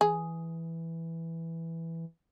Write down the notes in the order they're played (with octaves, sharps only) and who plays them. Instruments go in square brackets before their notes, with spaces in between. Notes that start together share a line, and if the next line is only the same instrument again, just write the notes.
[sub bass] E3 [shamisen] G#4